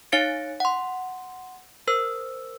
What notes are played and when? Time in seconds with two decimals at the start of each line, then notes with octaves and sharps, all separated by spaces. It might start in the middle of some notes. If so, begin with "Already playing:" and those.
0.12 D#4 C#5 F5 A6 C#7 D7
0.60 F#5 C6
1.88 A#4 C5 E6